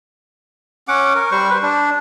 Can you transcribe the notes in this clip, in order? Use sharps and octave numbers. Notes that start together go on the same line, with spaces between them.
C#4 F#5 D6
A#4
G3 C5 C#6
B4 C5
D4